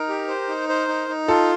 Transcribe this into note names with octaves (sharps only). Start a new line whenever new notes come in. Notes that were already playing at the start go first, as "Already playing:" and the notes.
Already playing: D#4 A#4
G4
C5
D#4
C5
D#4
D#4
F4 A4